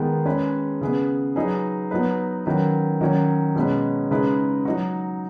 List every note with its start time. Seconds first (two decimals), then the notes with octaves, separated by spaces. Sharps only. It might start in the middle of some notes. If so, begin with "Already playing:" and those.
Already playing: D#3 G#3 B3 G#4
0.26 G#3 C#4 G#4 B4
0.81 C#3 B3 G#4 B4
1.36 F#3 D#4 G#4 B4
1.91 F#3 B3 D#4 B4
2.46 D#3 F#3 C#4 B4
3.01 D#3 F#3 C#4
3.55 B2 G#3 C#4 B4
4.11 C#3 G#3 D#4 G#4 B4
4.65 F#3 D#4 F#4